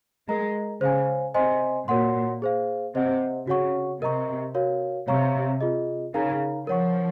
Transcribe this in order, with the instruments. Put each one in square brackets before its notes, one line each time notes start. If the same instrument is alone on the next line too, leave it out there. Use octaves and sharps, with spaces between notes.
[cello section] G#3 [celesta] A#4 D#5 A#5
[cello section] C#3 [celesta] C5 F5 G#5
[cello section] C3 [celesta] C5 D#5 G#5 C6
[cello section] A#2 [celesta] F#4 A#4 C#5 F#5 C6
[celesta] G#4 C5 F5
[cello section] C3 [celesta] C5 D#5 F#5
[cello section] C#3 [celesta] F#4 C#5 F#5 C#6
[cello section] C3 [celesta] A#4 D#5 A#5 C#6
[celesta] F#4 A#4 C#5 F5
[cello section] C3 [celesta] C#5 F5 A#5 C#6
[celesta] F4 G#4 D#5
[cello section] C#3 [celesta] D#4 A#4 F5 A#5
[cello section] F3 [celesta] A#4 C#5 F#5 C#6